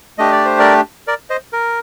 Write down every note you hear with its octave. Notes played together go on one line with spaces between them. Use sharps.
A3 D4 G4 D#5
D5
C5
A#4 D5
A#4 D5
C5 D#5
A#4